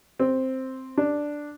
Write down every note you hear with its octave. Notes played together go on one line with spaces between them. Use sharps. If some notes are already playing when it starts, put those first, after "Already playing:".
C4
D4